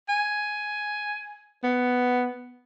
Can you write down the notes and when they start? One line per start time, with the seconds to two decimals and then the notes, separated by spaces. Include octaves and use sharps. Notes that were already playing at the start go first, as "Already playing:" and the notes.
0.09 G#5
1.64 B3